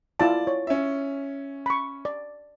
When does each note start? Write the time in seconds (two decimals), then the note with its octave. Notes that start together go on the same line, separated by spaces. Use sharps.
0.20 E4 F4 D5 A5
0.47 C#5
0.67 C#4 E5
1.66 B5 C#6
2.05 D5